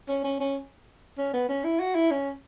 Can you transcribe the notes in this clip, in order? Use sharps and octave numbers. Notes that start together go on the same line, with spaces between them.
C#4
C#4
C#4
C#4
B3
C#4
E4
F#4
E4
C#4